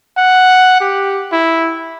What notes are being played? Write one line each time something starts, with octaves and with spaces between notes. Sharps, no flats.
F#5
G4
E4